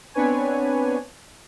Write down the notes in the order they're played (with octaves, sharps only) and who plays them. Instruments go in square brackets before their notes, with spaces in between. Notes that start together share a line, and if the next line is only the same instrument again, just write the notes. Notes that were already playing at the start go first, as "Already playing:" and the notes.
[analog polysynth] B3 C4 D4 B4 C#5 G#5